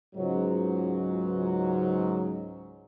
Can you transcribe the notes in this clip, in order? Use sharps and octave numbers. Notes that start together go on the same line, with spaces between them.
C#2 G#2 F#3